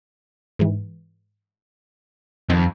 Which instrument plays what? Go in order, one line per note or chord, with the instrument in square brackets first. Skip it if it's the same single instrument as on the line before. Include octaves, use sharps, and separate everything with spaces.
[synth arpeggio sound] G#2 E3
[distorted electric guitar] F2 [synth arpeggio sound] D#3 C4 D#4